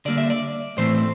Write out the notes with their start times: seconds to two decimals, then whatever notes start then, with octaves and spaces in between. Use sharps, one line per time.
0.05 D3 G3 A#3 D5
0.18 E5
0.30 D5
0.77 A2 E3 A3 C4 C5